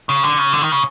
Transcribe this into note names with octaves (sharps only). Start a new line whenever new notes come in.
C#3
D3
C#3
D3
D#3
C#3